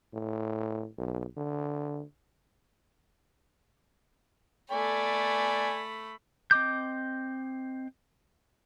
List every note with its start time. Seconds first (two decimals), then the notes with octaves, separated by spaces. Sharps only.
0.13 A2
0.98 B1
1.37 D3
4.71 A3 D5 G#5 B5
6.51 C4 D#5 D6 G6